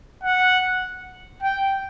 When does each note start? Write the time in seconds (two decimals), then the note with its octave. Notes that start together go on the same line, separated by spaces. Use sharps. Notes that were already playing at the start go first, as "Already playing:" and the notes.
0.23 F#5
1.42 G5